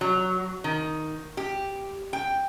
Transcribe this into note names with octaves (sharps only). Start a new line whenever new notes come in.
F#3
D#3
G4
G5